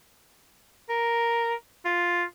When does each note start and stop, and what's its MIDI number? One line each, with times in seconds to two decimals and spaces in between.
0.89 1.54 70
1.85 2.24 65